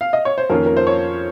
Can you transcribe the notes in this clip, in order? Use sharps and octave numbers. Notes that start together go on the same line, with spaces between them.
F5
D#5
C#5
C5
F2 D#3 A#3 C#4 F4 A#4
A#4
C5
C#5